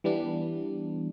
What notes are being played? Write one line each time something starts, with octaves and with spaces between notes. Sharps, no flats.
E3 G3 B3 D4